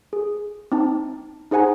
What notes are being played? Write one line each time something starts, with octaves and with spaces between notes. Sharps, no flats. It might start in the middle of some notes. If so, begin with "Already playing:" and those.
G#4
C4 D#4 A5
D#4 G#4 C5 F#5 G#5 A#5